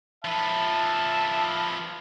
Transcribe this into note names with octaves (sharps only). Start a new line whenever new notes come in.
F3 B4 E5 A5